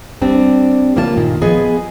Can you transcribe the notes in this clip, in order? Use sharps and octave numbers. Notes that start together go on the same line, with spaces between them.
G3 C4 D4
C#3 G3 A#3 F4 D#5 A5
G2 A#2 D#3
F3 B3 G#4 B4 D#5 G#5